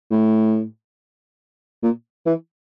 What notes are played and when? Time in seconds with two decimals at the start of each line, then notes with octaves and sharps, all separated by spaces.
0.11 A2
1.83 A#2
2.26 E3